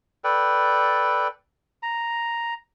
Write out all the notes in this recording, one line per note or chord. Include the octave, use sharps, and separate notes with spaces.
A4 B4 D5 G5
A#5